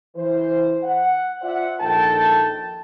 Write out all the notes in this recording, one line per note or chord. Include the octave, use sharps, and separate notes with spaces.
E3 C5
F#5
F4 C5 D5 E5 F#5
A#1 D#3 F4 A4 G5 A5